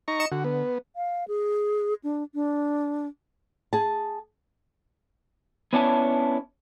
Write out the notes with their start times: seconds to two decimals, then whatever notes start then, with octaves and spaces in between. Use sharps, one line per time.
0.08 D#4 A#5 C#6
0.20 D#5 C#7 E7
0.32 D3 F#4
0.44 B3
0.96 F5
1.28 G#4
2.04 D4
2.34 D4
3.73 G#4 A5
5.73 B3 C#4 D4 E4 C#5 A5